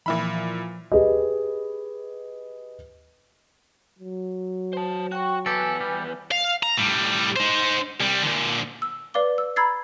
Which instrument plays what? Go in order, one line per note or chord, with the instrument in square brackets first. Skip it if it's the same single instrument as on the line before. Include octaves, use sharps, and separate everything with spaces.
[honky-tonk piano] A#2 E4 B5 [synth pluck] E3 F3
[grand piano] G4 G#4 B4 D#5
[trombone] F#3
[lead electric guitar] C5 A5
[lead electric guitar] F#4 [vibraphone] G5 C#6
[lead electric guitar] E2 B4 [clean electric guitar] G4 A4 [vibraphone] G#5
[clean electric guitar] G3
[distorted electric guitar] F5
A#5
A2 G3
D#4 C5
C2 G3
A#2 D3
[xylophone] E6
B4 D5 F5 D6 G7
E6
A#5 B5 E6 G#6 A6 C7